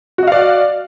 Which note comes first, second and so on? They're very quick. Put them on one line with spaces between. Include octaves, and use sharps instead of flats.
F#4 D#5 F5 D5